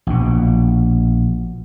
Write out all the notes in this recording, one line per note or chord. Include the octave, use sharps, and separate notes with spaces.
A#1 B2